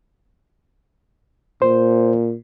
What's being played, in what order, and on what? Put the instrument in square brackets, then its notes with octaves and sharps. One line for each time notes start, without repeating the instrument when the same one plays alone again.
[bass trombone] A#2 [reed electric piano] C5